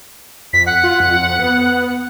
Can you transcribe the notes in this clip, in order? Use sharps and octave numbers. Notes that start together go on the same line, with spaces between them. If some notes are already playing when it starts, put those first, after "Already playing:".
F2 B6
F#5
F4
F2
B3